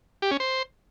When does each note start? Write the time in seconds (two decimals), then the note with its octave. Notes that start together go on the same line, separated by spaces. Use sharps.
0.22 G4
0.31 C#4
0.40 C5